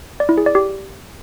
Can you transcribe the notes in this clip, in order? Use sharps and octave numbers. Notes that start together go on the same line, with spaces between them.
D5
E4
G#4
D5
G4